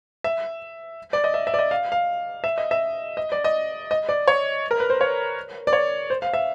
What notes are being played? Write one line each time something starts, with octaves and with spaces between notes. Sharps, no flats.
E5
D5
D#5
E5
E5
D5
D#5
F5
F5
E5
D#5
E5
D#5
D5
D#5
D#5
D5
C#5
A#4
B4
C5
C#5
D5
C#5
C5
F5
E5